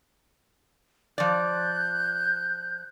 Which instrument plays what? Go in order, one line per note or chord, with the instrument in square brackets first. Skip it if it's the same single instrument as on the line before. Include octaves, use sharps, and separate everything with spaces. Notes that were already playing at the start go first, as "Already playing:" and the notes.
[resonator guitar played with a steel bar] F3 D5 [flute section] F#6 G6